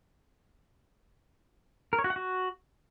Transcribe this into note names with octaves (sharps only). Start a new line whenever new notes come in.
A#4
C#5
F#4
F#5
F#4